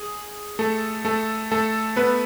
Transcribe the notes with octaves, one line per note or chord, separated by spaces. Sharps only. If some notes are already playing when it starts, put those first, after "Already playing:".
Already playing: G#4
A3 A4
A3 A4
A3 A4
B3 B4